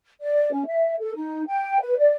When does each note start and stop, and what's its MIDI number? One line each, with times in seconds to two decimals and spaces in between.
0.20 0.51 74
0.51 0.63 61
0.65 0.94 76
0.99 1.11 69
1.14 1.42 63
1.46 1.80 79
1.80 1.94 71
1.98 2.15 74